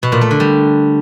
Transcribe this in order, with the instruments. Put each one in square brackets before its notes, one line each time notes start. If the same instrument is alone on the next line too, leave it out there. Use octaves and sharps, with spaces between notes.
[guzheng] B2
A#2
A3
D3
G3